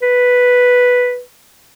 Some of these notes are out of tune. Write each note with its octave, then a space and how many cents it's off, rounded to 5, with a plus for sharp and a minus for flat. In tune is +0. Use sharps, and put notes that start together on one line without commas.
B4 -5